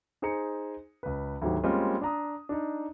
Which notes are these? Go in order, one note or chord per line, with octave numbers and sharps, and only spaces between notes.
D#4 G#4 C5 A#5 C#7
C#2 B4
D2 G#2 D#3 F#3 G4
G3 G#3 A#3 C4 C#4 F4
D4 A#5 D#6
D4 D#4